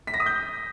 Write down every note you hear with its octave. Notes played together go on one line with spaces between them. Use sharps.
B6
A#6
D#6
G6